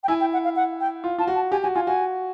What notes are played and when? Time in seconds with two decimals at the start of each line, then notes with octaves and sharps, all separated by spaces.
0.04 G5
0.08 E4 G#5
0.21 G5
0.33 F#5
0.44 F5
0.56 F#5
0.80 G5
1.04 F4
1.18 F4 A5
1.27 F#4
1.35 A5
1.52 G4 G#5
1.63 F#4 G#5
1.75 F4 G#5
1.87 F#4 G#5